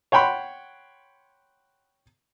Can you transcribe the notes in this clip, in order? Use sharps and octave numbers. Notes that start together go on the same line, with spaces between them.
C#5 F#5 G5 B5 C6